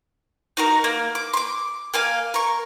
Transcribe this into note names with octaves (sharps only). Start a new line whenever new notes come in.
D#4 F#4 A#4
A#3
D6
C6 D6
A#3 F5 G#5
A#4 C#6